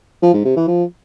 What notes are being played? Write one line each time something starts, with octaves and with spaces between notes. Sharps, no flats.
F3
G#2
C3
E3
F3